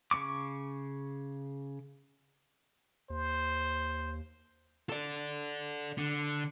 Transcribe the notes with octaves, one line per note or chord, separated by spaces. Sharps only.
C#3 C#4 C#6 D6
D#2 C5
A4 D5
D3